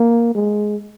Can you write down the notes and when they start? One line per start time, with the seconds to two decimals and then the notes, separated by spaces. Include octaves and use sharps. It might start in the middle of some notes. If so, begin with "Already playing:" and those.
Already playing: A#3
0.35 G#3